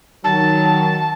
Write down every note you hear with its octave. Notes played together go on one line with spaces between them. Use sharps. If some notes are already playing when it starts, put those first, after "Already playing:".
D#3 F#3 A5